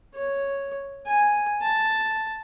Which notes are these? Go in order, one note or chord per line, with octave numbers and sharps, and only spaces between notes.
C#5
G#5
A5